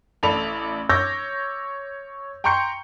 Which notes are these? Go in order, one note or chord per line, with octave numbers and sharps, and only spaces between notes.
A1 A4 D5 B5 F7
C#5 D6 E6 G6 A#6
G5 A#5 C6 C#6 G6 C#7